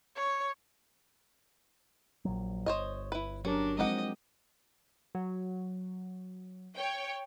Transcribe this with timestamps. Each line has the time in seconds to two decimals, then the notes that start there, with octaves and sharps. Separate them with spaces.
0.16 C#5
2.25 A#1 F#3
2.66 G1 C5 C#5 D#5
3.12 E4 B4
3.45 F#3 C#4 D4 G4 A#4
3.79 F3 G#3 C4 D#4 G4 D#5 F#5
5.15 F#3
6.76 C#5 G5